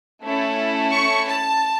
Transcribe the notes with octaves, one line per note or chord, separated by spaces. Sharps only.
A3 C#4 E4 A4
C#6
A5